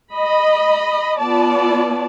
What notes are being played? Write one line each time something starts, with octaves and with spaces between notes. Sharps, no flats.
D#5 B5
B3 F4 D5 A5